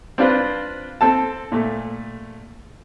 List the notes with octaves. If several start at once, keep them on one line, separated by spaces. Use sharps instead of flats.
C4 D4 F4 B4 C5
C4 A4 A5
A#2 A3